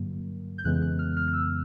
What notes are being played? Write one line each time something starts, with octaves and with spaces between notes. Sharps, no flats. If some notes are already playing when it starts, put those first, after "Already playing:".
Already playing: G2 D3 F#3 A#3
G6
F2 C#3 E3 G#3 B3 F#6
F#6
F6
F6
F6
E6